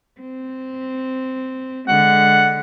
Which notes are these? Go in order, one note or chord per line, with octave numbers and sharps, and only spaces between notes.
C4
D3 G#3 F#5